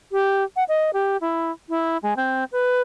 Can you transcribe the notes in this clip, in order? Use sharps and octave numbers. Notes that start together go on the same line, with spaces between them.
G4
F#5
D#5
G4
E4
E4
G#3
C4
B4